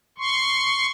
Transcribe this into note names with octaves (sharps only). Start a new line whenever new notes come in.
C6 C#6